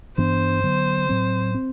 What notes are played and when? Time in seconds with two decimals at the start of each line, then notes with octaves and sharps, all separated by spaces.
0.18 G2 E3 B3 D4 C5
0.64 D3 F#3 B3
1.09 A2 F#3 C4
1.54 C4